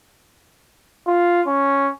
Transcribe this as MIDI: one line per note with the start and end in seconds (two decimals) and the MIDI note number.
1.07 1.42 65
1.47 1.90 61